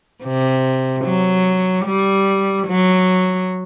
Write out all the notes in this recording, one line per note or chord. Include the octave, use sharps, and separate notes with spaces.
C3
F#3
G3
F#3